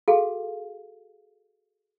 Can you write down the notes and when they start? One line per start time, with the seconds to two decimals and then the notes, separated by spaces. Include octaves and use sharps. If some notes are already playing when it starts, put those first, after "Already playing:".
0.08 F#4 G#4 A4 F5